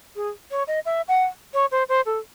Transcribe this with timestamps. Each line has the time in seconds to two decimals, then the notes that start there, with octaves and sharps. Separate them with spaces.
0.16 G#4
0.51 C#5
0.67 D#5
0.85 E5
1.08 F#5
1.54 C#5
1.71 C5
1.89 C5
2.06 A4